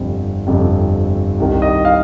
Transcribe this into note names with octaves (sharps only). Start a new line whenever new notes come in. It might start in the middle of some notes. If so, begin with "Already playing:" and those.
Already playing: G1 F2 C3
G1 F2 C3
C2 C3 D#3
D#5
F5